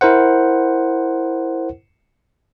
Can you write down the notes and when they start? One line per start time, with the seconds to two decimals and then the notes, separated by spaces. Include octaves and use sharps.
0.01 E4 A#4 C5 F#5